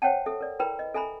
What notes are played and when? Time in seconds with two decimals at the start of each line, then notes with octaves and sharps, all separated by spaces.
0.02 C5 C#5 F#5 G5 A5
0.26 A4 E5
0.41 A#4 D5
0.60 E4 A#4 B4 G5 A#5 B5
0.79 D#5
0.94 A4 E5 G#5 A#5 B5